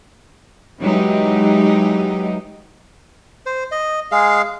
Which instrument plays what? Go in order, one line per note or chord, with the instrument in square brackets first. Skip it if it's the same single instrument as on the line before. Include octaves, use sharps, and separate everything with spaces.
[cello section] E3 F#3 G#3 D#4 G4
[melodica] C5
D#5
G#3 G#4 F5